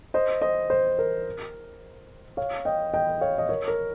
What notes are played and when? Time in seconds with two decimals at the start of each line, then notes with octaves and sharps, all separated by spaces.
0.14 C5 D#5
0.42 C5 D#5
0.70 C5
0.99 A#4
2.37 C#5 F5
2.65 D#5 G5
2.94 D#5 G5
3.21 C#5 F5
3.38 D#5
3.49 A#4 C#5
3.68 A#4